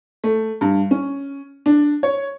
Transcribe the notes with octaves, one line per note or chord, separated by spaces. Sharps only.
A3
G2
C#4
D4
C#5